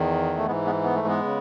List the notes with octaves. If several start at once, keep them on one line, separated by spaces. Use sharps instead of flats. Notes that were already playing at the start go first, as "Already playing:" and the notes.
Already playing: E2 D#3
A3
G#2 E3 G#3 B3
G#3 B3
B3
A3
G#3 B3
C#3